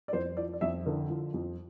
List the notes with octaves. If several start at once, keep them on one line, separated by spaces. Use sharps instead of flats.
D5
F2 C5
F3 D5
D5
F2 E5
D3 A#4
F3
F2